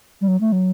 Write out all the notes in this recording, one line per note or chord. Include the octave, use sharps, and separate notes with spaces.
G3
F#3
A3
F#3